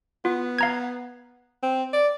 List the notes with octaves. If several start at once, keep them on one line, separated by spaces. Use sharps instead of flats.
B3 F4
F5 A#5 G#6
C4
D5